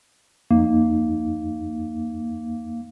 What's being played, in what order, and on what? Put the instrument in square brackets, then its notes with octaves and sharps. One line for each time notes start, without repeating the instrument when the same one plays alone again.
[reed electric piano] F2 D#4 [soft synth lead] A#3